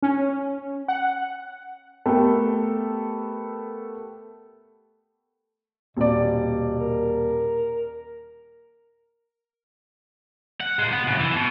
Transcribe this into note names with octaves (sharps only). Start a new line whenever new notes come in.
C#4
F#5
A3 B3 G4 A4 A#4
D#1 B2 D5
A#4
F#5
A#2 G#3
B3
F#2 C#3
E3
B2